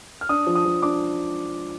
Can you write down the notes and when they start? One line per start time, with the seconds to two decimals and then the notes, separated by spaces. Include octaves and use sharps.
0.21 F6
0.29 D4 D#6
0.47 F3
0.55 D#6
0.65 F3
0.82 D4 D6